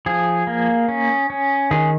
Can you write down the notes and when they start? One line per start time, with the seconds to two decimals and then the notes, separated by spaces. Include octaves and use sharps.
0.06 F3 G#4
0.47 A#3
0.88 C#4
1.30 C#4
1.71 D#3 G#4